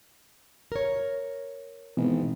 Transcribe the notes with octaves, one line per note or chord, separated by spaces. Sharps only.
A#4 C#5
G#1 B2 E3 B3